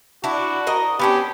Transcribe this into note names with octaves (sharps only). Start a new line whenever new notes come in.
D4 E4 F#4
A#4 D#5
B3 C#4 D4 G4